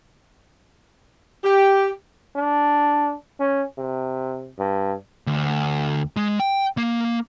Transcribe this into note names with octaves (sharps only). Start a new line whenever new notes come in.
G4
D4
C#4
C3
G2
D2
G#3
G5
A#3